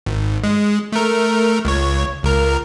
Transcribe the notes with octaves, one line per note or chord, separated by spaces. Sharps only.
G#1
G#3
A3 A#4
C#2 C#5
C#2 A#4